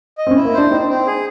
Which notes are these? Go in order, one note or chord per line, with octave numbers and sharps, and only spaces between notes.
D#5
C4
C#4
E4
A#3
D4 C5
C4 D#4
C4
G#4